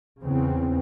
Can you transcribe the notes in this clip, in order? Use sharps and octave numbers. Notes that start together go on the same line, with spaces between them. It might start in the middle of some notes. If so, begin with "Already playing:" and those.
E2 C#3 C4